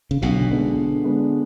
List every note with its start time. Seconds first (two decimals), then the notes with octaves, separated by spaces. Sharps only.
0.11 C#3
0.22 B1 B2 D3
0.49 G#3 B3 D4
0.77 D3
1.04 G#3 B3 D4